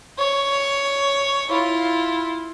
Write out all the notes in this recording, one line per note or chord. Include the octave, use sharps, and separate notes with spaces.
C#5
E4 F4